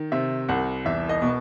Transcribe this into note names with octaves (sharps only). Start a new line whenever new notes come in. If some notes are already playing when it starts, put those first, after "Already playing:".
Already playing: D#3
C3 E5
C2 F#5
E2 E5
D#5
B2